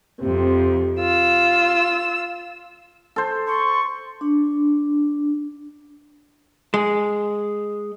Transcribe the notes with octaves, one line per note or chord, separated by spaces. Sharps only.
F2 C3
F4 E6
A4 C5
C6 C#6
D4
G#3